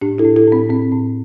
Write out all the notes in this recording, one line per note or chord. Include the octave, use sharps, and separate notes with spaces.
A2 D4 G4
E4 A4
A2
E4 A4
A2 C4
A2 C4
A2